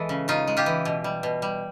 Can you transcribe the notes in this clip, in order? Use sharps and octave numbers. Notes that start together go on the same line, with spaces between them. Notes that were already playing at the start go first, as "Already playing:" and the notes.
Already playing: E3 G#3 A4
C#3
C#3 D#4 F4
G#3
F4 G4
E3
B2
G3
B2
G3